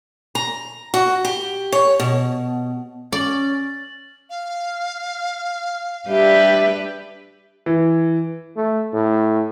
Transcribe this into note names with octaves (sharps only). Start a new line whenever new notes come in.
A#5
F#4
G4
C#5
B2
C#4 D5 A6 F#7
F5
G3 D4 G4 B4 E5
E3
A3
A2